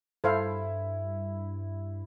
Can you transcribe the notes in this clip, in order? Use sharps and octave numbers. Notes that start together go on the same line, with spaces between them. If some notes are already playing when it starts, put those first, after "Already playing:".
G2 E4 A4 C5 F5